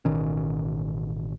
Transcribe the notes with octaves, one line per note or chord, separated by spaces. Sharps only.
A1 B2 D#3 C#4